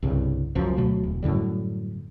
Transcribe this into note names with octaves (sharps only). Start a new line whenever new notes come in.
C2 G2 C#3
C#2 F#2 F3
D2 B2 F#3 A3
E1
F#2 A2 D3 G3